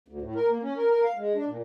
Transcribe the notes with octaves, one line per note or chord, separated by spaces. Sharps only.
D2
A2
A#4
A#3
C#4
A#4
A#4
F5
G#3
D4
A#2